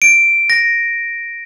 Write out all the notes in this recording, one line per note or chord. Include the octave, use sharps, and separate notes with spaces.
D7
A#6